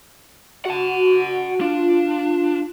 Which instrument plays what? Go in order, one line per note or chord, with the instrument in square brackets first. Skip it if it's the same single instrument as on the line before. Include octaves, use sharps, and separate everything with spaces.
[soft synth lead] F#4 [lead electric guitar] F#5 A5
[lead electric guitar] D4 [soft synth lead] F4